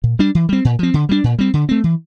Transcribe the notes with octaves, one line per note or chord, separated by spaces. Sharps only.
A#2
G3 D4
E3
G3 C4
A#2
F3 C4
D3
G3 A#3 D4
A#2
G3 C4
D3
A3 C4
E3